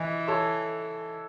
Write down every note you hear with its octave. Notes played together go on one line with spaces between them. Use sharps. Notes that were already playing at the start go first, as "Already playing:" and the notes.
Already playing: E3 D#5
A4 C#5